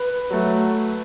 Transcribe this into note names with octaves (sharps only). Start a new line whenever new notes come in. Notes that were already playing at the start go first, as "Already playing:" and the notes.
Already playing: B4
F#3 A3